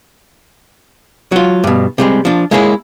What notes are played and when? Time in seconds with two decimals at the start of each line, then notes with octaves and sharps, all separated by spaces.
1.32 F#3 F4
1.64 G2 B2
1.98 C3 G3 G#3
2.25 F3 D4
2.51 G#3 A#3 E4 G#4 A4 C#5